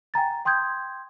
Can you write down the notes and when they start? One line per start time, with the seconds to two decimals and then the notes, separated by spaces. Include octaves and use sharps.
0.14 G5 G#5 A#5 A6
0.45 G5 C6 D#6 G6 G#6